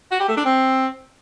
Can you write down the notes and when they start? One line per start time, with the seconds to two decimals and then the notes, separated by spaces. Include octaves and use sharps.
0.12 F#4
0.20 G4
0.28 A3
0.37 D4
0.45 C4